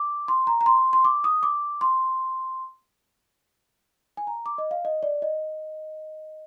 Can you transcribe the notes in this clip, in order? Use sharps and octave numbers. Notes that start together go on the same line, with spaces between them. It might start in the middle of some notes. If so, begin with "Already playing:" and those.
Already playing: D6
C6
A#5
A#5
C6
C6
D6
D#6
D6
C6
G#5
A#5
D6
D#5
F5
D#5
D5
D#5